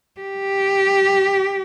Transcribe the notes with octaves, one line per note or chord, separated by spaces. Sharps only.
G4